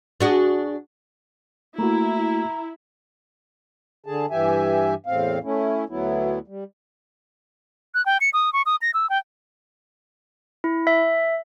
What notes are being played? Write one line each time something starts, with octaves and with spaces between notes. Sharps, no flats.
D4 F#4 G#4
A3 A#3 E4 F#4 A#5
D3 G#4 A5
G2 E3 G4 E5 G#5
E2 A2 C4 F5
A3 C#4 E4
D2 F#3 B3 E4
G3
F#6
G5
C#7
D#6
C#6
D#6
A#6
E6
G5
E4
E5